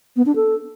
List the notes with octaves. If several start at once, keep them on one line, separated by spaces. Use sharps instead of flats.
B3
D4
A4